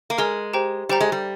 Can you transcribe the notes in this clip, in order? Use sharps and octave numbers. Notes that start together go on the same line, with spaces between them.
A#3
G#3 A#4 D#5 A#5 F6
G4 C5 G5 A#5
G3 G4 C5 G5 A#5
G#3
G3